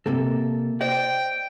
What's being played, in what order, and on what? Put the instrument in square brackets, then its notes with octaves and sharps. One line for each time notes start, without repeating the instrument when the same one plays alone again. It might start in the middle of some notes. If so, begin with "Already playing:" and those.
[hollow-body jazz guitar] C3 A#3 A4
[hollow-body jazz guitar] C5 D5 D#5 [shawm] G5